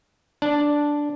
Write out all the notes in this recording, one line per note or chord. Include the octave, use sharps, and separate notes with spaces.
D4